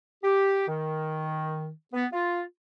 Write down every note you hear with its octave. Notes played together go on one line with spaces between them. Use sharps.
G4
D#3
B3
F4